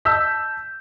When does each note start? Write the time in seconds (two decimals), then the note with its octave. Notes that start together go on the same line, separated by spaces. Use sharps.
0.05 A5 E6 G6 B6